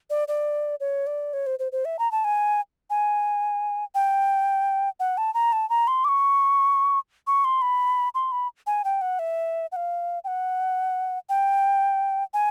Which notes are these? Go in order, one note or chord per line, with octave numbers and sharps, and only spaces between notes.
D5
D5
C#5
D5
C#5
C5
C5
C5
E5
A#5
A5
G#5
G#5
G5
F#5
A5
A#5
A5
A#5
C6
D6
C#6
C#6
C6
B5
C6
B5
G#5
G5
F#5
E5
F#5
F5
G5
F#5
G5
G#5